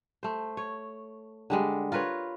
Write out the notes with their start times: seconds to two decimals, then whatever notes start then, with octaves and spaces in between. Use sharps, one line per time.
0.23 A3 C5
0.57 C#5
1.50 D3 G3 G#3
1.92 F4 A#4 B4 C#5